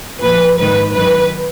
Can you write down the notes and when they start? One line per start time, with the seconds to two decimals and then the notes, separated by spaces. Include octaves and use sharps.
0.21 A#2 F3 B4
0.58 G#2 D#3 B4
0.95 F#2 D#3 B4